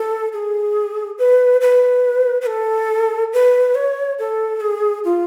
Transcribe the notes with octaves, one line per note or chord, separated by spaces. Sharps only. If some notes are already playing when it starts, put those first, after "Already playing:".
Already playing: A4
G#4
B4
B4
B4
A4
B4
C#5
A4
G#4
F4